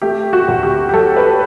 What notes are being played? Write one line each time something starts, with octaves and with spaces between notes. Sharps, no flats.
A3 G4
F#4
D2
G4
G4
F#3 A4
B4